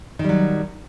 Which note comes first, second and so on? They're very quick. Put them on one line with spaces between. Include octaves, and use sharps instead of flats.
D#3 G3 F#3